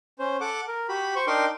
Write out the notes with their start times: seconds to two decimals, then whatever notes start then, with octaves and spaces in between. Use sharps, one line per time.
0.19 C#4 C5
0.41 A4 F#5 D6
0.68 A#4
0.89 F#4 G4 B5
1.15 C5 C#6
1.27 D4 D#4 A#4 G5 C6 D6